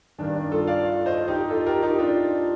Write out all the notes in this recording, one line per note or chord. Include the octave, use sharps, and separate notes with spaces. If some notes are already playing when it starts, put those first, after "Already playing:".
G2 D#3 D4
D4
F4 A4
D5 F5
C5 D#5
D#4 G4
F4 A4
G4 A#4
D#4 G4
D4 F4